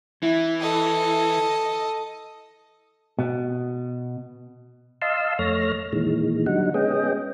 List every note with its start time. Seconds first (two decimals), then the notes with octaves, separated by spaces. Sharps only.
0.23 E3 E4
0.60 A4 D#5
3.19 B2
5.02 D#5 F5 A5 C6 E6
5.39 F2 A3 C#5 F6 A#6
5.93 A#2 D#3 E3 G#3
6.46 D3 F#3 G3 D#4 F#5
6.74 G#3 B3 C#4 G#4 D#5 G5